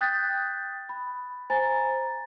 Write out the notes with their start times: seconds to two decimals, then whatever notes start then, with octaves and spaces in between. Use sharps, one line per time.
0.01 G5 D#6 F#6 G6 A6 B6
0.89 B5
1.50 C5 G#5 A#5 A6